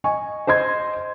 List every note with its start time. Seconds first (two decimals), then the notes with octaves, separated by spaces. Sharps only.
0.04 D#5 G#5 C#6
0.47 C5 D#5 C6 G#6